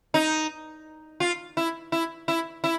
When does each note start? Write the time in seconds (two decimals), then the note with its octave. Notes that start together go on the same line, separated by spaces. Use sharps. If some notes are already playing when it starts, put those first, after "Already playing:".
0.14 D#4
1.20 F4
1.57 E4
1.92 E4
2.28 E4
2.64 E4